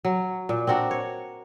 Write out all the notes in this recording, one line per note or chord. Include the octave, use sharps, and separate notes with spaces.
F#3
A#2
C4 D4 F#4 A#4
C#5